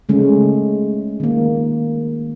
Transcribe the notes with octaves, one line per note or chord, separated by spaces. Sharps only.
C#3 G#3 A3 C#4
D#3 A#3